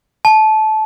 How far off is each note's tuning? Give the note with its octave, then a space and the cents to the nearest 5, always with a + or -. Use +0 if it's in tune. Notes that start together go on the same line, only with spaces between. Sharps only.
A5 -20